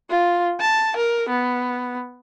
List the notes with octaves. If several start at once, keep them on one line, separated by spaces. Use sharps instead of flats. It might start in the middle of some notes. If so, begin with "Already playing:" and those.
F4
A5
A#4
B3